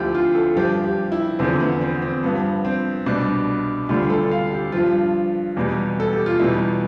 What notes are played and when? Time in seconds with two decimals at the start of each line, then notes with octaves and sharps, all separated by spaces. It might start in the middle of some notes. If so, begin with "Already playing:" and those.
Already playing: D2 D3 F3 E4 G4
0.15 F4
0.35 A4
0.56 G2 F3 G4
0.84 G4
1.12 E4
1.39 E2 D3 F3 C4
1.60 B3
1.81 C4
2.02 C4
2.23 G2 F3 B3
2.65 C4
3.06 C2 B2 G3 D4
3.89 D2 D3 G3 F4
4.10 A4
4.31 F5
4.52 G4
4.72 G2 F3 F4
5.57 E2 B2 G3
6.00 A4
6.13 G4
6.26 F4
6.39 E2 B2 G3 E4